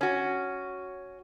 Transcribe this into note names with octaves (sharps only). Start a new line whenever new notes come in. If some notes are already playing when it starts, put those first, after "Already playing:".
C#4 F#4